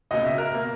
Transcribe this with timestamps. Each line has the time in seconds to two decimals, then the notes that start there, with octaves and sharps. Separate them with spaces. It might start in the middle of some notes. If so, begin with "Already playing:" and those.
0.11 C#2 B2 A#3 D#5
0.25 E5
0.38 A#4
0.53 B2 A#3